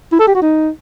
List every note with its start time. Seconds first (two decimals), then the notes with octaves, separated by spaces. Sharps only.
0.12 E4
0.20 A4
0.27 G4
0.35 F#4
0.42 D#4